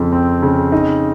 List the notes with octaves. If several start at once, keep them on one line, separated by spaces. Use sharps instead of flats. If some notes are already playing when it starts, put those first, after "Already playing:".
Already playing: F2 C#3 F3 C4
C4
C#3
D#4